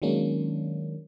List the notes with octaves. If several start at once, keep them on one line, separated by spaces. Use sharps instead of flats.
D#3 F#3 G#3 A#3 C#4 D4